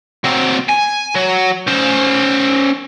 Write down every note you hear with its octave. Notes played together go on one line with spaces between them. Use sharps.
F#3 C4
G#5
F#3
C#4 C5